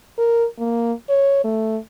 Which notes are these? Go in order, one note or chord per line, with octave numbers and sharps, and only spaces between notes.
A#4
A#3
C#5
A3